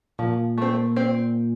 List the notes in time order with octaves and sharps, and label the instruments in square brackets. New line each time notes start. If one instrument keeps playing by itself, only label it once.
[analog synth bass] A#2 [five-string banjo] F3
[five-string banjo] A3 C4
C4